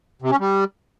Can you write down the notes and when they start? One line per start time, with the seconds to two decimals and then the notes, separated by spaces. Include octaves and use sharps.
0.22 C3
0.31 C#4
0.40 G3